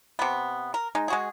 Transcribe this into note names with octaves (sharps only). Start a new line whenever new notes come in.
C3 B3
A#4
G#3 D#4
G#3 F#4 G#4